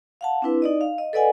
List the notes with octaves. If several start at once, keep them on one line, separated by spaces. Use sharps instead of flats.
F5 F#5 A5
C4 D4 E4 B4
D#4 D5 D#5
F5
D#5
A4 B4 D5 D#5 F#5 G#5